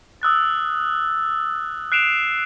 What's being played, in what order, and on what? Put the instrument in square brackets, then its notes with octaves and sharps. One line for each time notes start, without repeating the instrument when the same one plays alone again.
[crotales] D#6 E6 F#6 A6
F#6 C7 D7 E7 F7